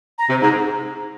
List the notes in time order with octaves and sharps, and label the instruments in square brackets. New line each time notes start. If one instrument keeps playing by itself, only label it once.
[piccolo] A#5
[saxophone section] C3
[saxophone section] G#2 [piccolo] A#5